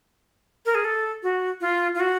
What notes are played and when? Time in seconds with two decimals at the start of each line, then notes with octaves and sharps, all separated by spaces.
0.66 A#4
0.75 G#4
0.85 A4
1.23 F#4
1.61 F4
1.95 F4
2.00 F#4